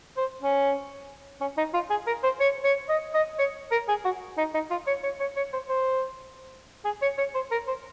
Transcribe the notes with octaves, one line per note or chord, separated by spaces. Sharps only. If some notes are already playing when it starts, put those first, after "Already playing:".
C5
C#4
C#4
D#4
F4
G#4
A#4
C5
C#5
C#5
D#5
D#5
C#5
A#4
G#4
F#4
D#4
D#4
F4
C#5
C#5
C#5
C#5
C5
C5
G#4
C#5
C#5
C5
A#4
C5